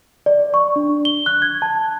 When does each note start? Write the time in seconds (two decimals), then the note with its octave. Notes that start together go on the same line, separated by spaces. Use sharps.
0.26 D5
0.54 C#6
0.76 D4
1.05 G7
1.26 F#6
1.42 G#6
1.62 A5